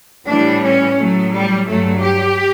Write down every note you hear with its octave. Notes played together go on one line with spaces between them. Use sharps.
A2 E3 G3 D4
C#4
A2 F#3 A3
G3
G2 F#3 A3
G4